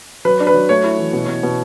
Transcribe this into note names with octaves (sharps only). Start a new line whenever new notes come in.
F#3 B4
D4
B4
F#3
A3 C#5
E4
E3
B2
B2
B2